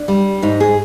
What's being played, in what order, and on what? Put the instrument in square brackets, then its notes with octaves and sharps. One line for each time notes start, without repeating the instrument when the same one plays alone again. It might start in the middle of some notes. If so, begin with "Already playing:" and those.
Already playing: [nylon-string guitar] D4
G3
G#2 D#4
G#4